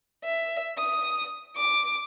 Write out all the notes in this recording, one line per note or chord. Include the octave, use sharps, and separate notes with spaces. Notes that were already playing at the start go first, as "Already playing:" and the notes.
E5
D#6
D6